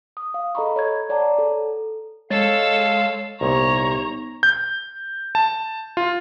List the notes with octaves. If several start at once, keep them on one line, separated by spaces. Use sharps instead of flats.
D#6
F5
A4 D#5 A#5 B5 C#6
C#5 C#6 G#6
C#5 D5 F#5 A5 A#5
A4
G#3 A4 C#5 F5 E6 A6
C2 A#2 B3 D#4 C#5 A#5
G6
A5
F4